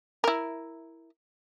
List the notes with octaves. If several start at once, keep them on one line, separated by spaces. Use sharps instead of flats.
E4 A#4